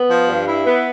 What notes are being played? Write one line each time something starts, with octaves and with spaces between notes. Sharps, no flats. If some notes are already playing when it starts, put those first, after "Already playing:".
Already playing: B3
F3
G2
E4
B3